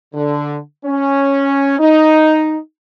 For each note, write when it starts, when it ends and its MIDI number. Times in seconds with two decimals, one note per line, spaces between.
0.14 0.58 50
0.85 1.75 61
1.79 2.57 63